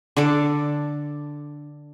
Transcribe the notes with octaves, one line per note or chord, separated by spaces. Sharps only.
D3 D4 A4 D6